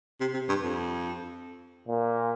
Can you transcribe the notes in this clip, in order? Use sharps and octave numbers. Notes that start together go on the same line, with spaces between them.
C3
C3
G2
F2
A#2